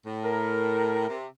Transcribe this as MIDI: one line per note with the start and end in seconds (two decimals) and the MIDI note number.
0.06 1.08 45
0.25 1.15 70
1.08 1.27 48